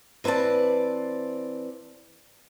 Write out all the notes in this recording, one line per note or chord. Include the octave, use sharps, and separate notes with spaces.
E3 C4 B4 D5 A5